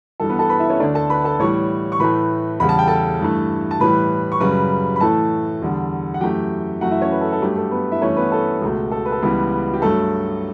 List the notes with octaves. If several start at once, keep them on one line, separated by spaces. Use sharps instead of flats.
G2 E3 G3 A4
B3 B4
A4 A5
B4 B5
E4 E5
C#4 C#5
D2 D3 A3 D4 D5
A4 A5
B4 B5
A4 A5
A2 E3 G3 C#5 C#6
C#6
A2 E3 A3 B4 B5
E2 C#3 G3 B5
A5
G5
A4 A5
G2 E3 A3
A5
A2 E3 G3 B4 B5
C#6
F#2 C#3 G3 B4 B5
B5
A2 E3 A3 A4 A5
E2 D3 G3
F#5
F#2 E3 A3 G4 G5
F#2 E3 A3 F#4 F#5
E4 E5
C#4 C#5
B4
A4
A4
G2 F#3 A3 G4
A4
B3 B4
E4 E5
G2 E3 A3 C#4 C#5
B3 B4
A4
C#2 B2 A3
A4
B4
A4
C#2 C#3 E3 G3 B3 B4
G4
G2 F#3 A3 A4